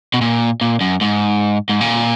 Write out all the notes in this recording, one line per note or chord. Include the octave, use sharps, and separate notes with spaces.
B2
A#2
A#2
F#2
G#2
G#2
A#2